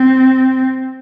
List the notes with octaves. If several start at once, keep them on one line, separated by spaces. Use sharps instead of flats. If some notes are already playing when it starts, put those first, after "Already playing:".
Already playing: C4